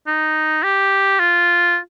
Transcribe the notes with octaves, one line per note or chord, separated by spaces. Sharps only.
D#4
G4
F4